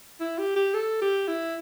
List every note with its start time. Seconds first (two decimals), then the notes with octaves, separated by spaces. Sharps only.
0.20 E4
0.38 G4
0.56 G4
0.74 A4
1.02 G4
1.28 E4